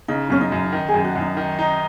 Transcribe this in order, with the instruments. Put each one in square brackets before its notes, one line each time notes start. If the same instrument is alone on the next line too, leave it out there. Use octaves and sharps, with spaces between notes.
[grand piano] C#3 [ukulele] D#4
[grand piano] F#2 [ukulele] C#4
[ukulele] D#4
[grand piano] F#2
D#3
[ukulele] G#4
[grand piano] F#2
[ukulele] F#4
[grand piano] F#2
[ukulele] D#4
[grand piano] D#3
D#4